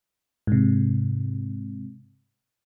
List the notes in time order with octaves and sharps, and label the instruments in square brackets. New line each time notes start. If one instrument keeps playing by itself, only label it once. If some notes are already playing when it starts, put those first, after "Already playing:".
[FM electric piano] G#2 C3